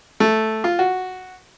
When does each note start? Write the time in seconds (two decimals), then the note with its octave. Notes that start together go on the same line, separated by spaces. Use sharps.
0.20 A3
0.64 F4
0.79 F#4